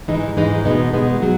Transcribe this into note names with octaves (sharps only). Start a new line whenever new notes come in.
G#2 E3 G#3 D#4
G#2 E3 G#3 D#4
B2 G#3 B3 D#4
B2 G#3 B3 D#4
F#3